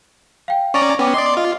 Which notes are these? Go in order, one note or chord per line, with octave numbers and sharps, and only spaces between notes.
F5 G5
C#4 D5 A#5 C#6 D6
B3 C#4 G5 D6
D5 D#5 C6 D6 D#6
F4 D#5